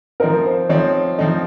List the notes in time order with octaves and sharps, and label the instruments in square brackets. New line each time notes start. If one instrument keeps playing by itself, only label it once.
[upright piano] F3 C4 D#4 [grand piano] A#4
[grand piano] C5
[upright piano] F3 C4 D#4 [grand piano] C#5
[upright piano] F3 C4 D#4